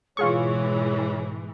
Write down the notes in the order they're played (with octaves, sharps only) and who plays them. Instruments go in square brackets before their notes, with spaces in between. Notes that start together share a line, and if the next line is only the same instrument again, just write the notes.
[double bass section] G#2 B2 [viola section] E3 G#3 [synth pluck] F4 G#4 C#6 [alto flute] C#5